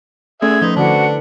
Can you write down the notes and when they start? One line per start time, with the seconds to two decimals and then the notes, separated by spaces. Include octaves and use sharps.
0.42 A3 C#4 G#4 A4 E5 G#6
0.61 F3 D#4 B4
0.76 D3 D4 E4 F#4